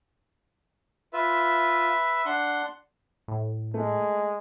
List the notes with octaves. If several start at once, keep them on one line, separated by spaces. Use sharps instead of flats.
F4 B4 E5
D4 F#5 C6
A2
G#3 A3